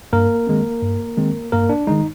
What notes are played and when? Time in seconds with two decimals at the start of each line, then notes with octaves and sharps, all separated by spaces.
0.13 G2 A#3 A#4
0.47 D#3 G#3 C4
0.83 G2
1.17 D#3 G#3 C4
1.52 G2 A#3 A#4
1.69 D4
1.87 D#3 G#3 D#4